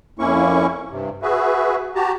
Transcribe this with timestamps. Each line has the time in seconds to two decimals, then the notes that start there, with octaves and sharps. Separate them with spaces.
0.19 F2 A#3 C#4 E4 C#6
0.91 G2 C3
1.22 F#4 G#4 B4 E5
1.95 F#4 G4 A5 A#5